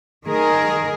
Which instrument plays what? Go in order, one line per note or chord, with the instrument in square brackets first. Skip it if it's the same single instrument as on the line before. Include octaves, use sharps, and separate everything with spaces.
[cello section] D#3 A3 G#4 A#4